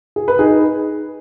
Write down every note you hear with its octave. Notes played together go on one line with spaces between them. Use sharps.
G#4
B4
D#4 G#4